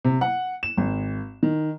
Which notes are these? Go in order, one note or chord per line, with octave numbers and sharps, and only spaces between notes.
C3
F#5
E7
G#1
D#3